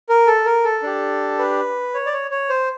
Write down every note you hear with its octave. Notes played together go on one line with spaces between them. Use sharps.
A#4
A4
A#4
A4
D4 G4
B4
C#5
D5
C#5
C#5
C5